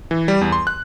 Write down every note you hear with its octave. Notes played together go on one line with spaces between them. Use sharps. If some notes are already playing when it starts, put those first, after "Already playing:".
E3
G3
E2
C6
F#6